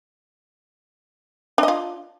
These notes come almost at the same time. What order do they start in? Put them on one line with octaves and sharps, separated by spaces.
D4 D#5 F4